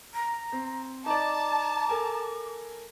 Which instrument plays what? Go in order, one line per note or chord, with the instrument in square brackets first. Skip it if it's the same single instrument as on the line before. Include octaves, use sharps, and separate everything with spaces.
[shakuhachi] A#5
[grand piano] C4
[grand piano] D#4 D5 [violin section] A5 [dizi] A#5 [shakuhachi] D6
[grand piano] A4 A#4 G#5